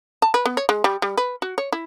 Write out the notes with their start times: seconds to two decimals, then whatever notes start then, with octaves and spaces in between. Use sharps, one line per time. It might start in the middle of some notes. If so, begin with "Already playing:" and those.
0.22 A5
0.34 B4
0.46 B3
0.57 C#5
0.69 G#3
0.84 G3
1.02 G3
1.17 B4
1.42 F#4
1.58 C#5
1.72 E4